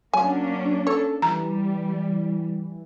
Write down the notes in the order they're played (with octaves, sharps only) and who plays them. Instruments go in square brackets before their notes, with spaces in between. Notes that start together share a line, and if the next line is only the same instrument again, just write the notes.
[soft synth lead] F#3 [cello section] A#3 C#4 D4 [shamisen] G#5
[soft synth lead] A4 [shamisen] C#5
[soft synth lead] E3 [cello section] G3 [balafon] A#5